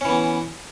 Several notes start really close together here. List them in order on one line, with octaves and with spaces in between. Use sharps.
C#4 E3 B3